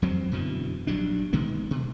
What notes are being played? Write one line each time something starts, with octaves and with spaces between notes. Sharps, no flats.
F2 F#3 C4
F#2 B2 D3 E3
A#1 F#3 G3 D4
B2 D#3 G#3 B3
B2